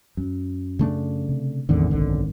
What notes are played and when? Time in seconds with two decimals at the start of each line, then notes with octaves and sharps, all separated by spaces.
0.17 F#2
0.79 C#3 A3 D4
1.29 C3
1.69 G#1 E2 A2 D3 D#3 C4
1.91 F#1 B1 D3